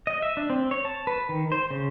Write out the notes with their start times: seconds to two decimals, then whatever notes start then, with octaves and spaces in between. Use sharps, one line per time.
0.07 D#5
0.22 E5
0.37 D4
0.50 C4
0.71 C#5
0.85 A5
1.07 B4
1.29 D#3
1.52 C5
1.71 C#3